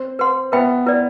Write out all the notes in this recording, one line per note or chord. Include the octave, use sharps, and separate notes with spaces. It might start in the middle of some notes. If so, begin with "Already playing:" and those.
Already playing: C4
B4 F#5 C6
B3 B4 E5 G5 B5
E4 B4 D5